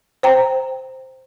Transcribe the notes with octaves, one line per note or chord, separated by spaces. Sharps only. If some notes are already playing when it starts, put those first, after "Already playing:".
C5 G5 A#5